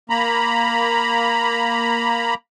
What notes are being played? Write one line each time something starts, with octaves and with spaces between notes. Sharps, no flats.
A#3 A#5 B5